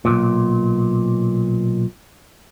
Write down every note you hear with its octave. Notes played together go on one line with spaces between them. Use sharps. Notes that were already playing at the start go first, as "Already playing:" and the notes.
B1 G2 A#2